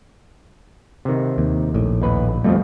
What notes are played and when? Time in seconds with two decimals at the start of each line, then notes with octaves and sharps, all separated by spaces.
1.05 C3 D#3
1.38 D#2
1.74 A#1 A2
2.02 D#2 B4
2.44 F2 B2 F3 G3 A3